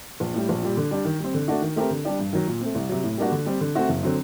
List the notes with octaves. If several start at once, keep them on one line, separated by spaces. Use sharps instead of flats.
A#1
A2 G3
A#1
A#2 G3
D3
G3 D4
D#3
G3 C4
D3
A3 D4 F#4
D#3
A3 C4 G4 A#4
D3
G3 D4 G4 D5
G2
D#3 F#3
A#2
A3 C4
C2
C3 F#3
A2
G3 A#3 D4 F#4
D3
G3 C4
D3
A3 C4 F#4
F#1
D3 F#3 C4